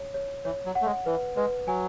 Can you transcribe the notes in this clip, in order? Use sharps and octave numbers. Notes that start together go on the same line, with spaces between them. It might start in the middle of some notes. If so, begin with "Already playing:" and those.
Already playing: C#5
C#5
E3 C#5
F#3
F#5
A3
G#3
E3 B4
G#3 B4
F#3 G#5